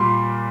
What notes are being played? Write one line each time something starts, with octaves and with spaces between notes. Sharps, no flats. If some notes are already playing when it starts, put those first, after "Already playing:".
Already playing: A#2 G3 A#3 C6 D6